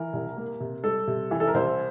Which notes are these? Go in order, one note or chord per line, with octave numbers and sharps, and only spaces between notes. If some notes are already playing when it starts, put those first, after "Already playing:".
Already playing: E3 A#4
C2
A#3
C3
G3 A4
C3
E3
A4
A#4
C2 C5